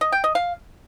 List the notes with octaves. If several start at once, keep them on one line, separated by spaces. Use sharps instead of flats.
D#5
G5
D#5
F5